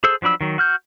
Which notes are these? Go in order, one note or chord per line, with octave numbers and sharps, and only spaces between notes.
G#4 A4 C5 E6
F3 F#3 D4 B5 E6
D#3 F#3
F#4 F6 G6